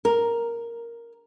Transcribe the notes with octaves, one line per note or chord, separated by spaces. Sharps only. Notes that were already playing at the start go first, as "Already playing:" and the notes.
A#4